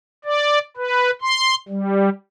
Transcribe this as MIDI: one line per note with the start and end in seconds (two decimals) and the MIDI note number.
0.25 0.59 74
0.77 1.11 71
1.21 1.55 84
1.69 2.09 55